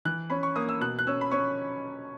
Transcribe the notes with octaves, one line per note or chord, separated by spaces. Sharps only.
E3 F#6
C#4 B5
C#6
A#3 D#6
E6
B2 F#6
F#6
C#4 E6
B5
C#4 C#6